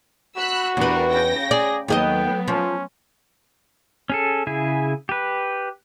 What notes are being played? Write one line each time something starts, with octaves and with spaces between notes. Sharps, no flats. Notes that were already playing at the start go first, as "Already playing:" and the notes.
F#4 B5 E6 F#6
E2 G3 D4 A#4 B4
C#3 G5 A#6
G#4 D5
D#2 F#3 A3 B3 G#4 D#5 G5
F3 C#4
C#4 G#4 A4
C#3 E4 G#4
G4 B4